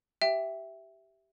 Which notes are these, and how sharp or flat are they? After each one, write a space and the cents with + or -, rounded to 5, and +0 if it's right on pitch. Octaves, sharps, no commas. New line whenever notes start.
G4 -15 E5 +0 G5 +0